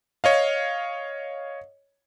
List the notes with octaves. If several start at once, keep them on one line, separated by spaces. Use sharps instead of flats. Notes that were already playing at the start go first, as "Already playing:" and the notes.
C#5 D#5 F5